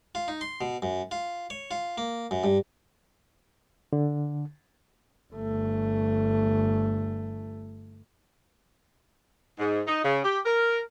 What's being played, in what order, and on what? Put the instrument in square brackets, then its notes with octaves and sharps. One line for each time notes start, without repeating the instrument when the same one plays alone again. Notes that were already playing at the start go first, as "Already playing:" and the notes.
[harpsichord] F4
D#4
C6
B2
F#2
F4
C#5
F4
A#3
F#2
G2
[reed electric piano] D3
[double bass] G1 A3
[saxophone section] G#2
D#4
C#3
G4
A#4